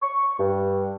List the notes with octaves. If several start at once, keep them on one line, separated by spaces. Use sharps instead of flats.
C#6
G2